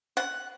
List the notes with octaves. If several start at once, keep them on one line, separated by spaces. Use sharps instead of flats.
F#5